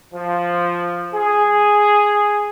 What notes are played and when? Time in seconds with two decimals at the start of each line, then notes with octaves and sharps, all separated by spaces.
0.13 F3
1.13 G#4